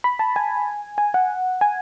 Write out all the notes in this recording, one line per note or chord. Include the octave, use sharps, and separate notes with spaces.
B5
A5
G#5
G#5
F#5
G#5